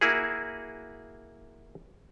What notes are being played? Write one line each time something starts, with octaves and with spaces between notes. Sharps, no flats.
A#3 E4 F#4 G#4